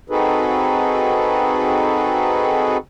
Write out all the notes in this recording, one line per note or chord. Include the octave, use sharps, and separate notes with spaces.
C4 D#4 F#4 G#4 A4 B4